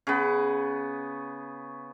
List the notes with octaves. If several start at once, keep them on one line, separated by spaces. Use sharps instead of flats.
C#3 B3